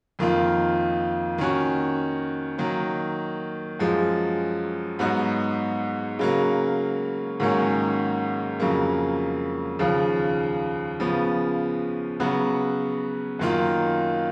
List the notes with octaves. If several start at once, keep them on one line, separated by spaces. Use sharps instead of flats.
F2 D#3 A#3 F4
D#3 A#3 C#4 F#4
D#3 F#3 A#3
F#2 F3 G#3
G#2 F#3 B3 D#4 F#4
C#3 F#3 A#3
G#2 D#3 F#3 A#3 C#4
F2 C#3 F#3 A#3
D#2 C#3 F3
C#3 F3 B3
C#3 F#3 B3 F#4
F#2 D#3 A#3 F4